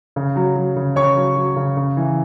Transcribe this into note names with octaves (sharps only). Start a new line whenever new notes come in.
C#3
F#3
F#3
C#3
C#3 C#5 C#6
F#3
F#3
C#3
C#3
E3